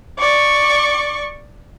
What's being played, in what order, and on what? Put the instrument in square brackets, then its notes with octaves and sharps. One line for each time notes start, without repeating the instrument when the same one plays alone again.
[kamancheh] D5 C#6